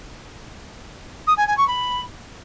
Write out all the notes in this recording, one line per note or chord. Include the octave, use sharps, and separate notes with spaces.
D#6
G#5
G#5
C#6
B5